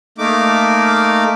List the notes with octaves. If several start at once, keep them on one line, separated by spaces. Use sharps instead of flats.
A3 A#3 D#4 D6